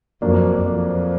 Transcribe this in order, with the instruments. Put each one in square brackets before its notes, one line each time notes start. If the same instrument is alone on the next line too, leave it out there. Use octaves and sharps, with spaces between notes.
[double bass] F2 [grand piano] F#3 A#3 D4
[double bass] F2